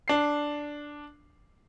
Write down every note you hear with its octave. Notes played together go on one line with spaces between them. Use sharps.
D4 C7